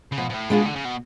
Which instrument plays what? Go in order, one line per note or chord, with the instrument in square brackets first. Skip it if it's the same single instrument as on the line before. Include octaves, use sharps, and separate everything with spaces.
[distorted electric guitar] C#3
[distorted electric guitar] B2 [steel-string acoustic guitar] F3
[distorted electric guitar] B2
A2
[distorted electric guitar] B2 [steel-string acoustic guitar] G#3 D4 F4 G#4
[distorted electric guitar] D3
C#3
B2